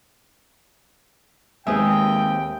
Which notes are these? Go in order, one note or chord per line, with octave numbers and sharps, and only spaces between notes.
D#2 G#3 C4 B4 E5 G5 G#5 D#6